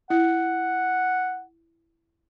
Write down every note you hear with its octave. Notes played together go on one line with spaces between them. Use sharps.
E4 F#5